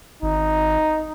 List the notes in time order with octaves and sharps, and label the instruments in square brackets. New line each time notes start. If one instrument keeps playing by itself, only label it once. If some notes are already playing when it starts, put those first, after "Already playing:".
[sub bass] G#1 [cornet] D#4